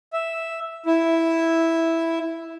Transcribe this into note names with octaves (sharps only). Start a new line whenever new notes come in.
E5
E4